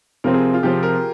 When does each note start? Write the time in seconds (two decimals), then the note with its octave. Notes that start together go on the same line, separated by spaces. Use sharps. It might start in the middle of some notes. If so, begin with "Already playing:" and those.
0.24 C3 F3 C4 A#4
0.34 G#4
0.54 F4
0.63 C3 F3 C4 G4
0.83 A#4